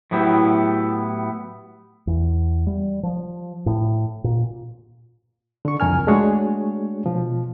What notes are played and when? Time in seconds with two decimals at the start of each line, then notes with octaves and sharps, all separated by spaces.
0.11 A2 F#3 B3 E4 G4
2.07 E2
2.67 G3
3.03 F3
3.66 A2
4.24 A#2
5.65 D3 C#6
5.80 C2 F2 A#4 G#5 F6
6.07 G#3 A3 D4 F#4 G#4 C#5
7.06 B2 F3